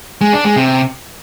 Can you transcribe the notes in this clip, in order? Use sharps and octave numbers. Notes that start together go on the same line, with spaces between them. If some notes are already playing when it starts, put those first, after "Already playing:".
G#3
D4
G#3
C3